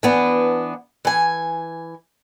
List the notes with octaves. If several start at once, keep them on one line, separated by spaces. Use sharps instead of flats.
E3 B3 D4
E3 G#5